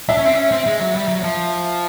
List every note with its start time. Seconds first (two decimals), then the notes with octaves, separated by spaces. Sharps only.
0.09 D4 E5
0.18 C#4
0.25 C4
0.34 C#4
0.51 C4
0.66 G#3
0.80 F#3
0.95 G3
1.08 F#3
1.23 F3